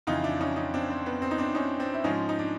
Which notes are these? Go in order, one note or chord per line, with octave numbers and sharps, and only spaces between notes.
F2 C#3 E3 D#4 F4
D4 E4
C#4 D#4
C#4 D#4
C4 D4
C4
B3
C4
D#4
C4 D4
C#4 D#4
C4 D4
E4
G#2 F3 G#3 C#4 D#4
D#4
D4